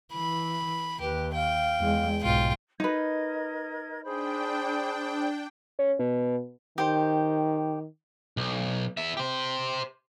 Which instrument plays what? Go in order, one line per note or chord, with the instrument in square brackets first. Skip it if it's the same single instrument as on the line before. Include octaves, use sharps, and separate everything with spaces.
[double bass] E3 [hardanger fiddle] B5
[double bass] D#2 [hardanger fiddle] G4 [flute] B4
[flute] F5 [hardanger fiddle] G5
[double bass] E2 G#3
[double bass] B1 G#2 [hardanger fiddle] F4 G5
[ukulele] D#4 B4 [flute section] A#4 D#5 G#6
[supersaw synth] D4 G5 [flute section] G#4 C5 B5
[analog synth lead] C#4
B2
[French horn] D#3 [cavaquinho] G4 C5
[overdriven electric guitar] B1
B3 E5
G4 C5